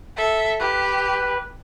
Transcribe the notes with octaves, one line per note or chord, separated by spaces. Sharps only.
A4 E5
G4 B4